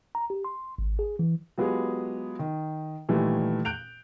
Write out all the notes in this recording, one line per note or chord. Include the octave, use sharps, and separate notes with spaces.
A#5
G4
C6
G#1
G#4
E3
F#3 G#3 B3 F4 G4 G#4
D#3
A#2 D#3 E3 G3 A3
F#6 G6 D7 F7